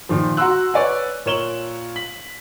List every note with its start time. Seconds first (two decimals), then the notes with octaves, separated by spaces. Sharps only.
0.09 A#2 D#3 F3
0.37 F#4 F#5 A#5 C6 E6 F#6
0.74 B4 C#5 D5 F#5 G#5
1.26 A#2 A#4 C#5 E7 F#7 G7
1.96 B6 F#7